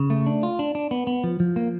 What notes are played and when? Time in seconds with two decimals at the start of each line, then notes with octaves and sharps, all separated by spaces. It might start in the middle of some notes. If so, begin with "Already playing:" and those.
Already playing: C#3
0.10 A3
0.26 D4
0.43 F4
0.59 D4
0.75 D4
0.91 B3
1.07 B3
1.24 F3
1.40 F3
1.56 A#3